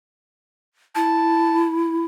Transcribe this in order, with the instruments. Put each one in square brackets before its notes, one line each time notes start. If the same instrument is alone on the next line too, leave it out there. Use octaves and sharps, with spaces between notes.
[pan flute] E4 [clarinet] A5